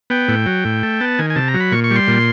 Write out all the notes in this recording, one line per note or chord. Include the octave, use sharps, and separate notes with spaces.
B3 G5
A2
F#3
A2
A3
B3 A5
D#3 G#5
G#5
C3 A5
A#5
F#3
B5
A#2 C#6
C#6
G3 C6
A#2